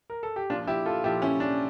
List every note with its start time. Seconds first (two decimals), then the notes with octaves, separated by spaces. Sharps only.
0.10 A#4
0.23 A4
0.36 G4
0.50 A#2 F3 D4 F4
0.67 E4 G4
0.86 F4 A4
1.04 A#2 F3 E4 G4
1.22 C#4 E4
1.40 D4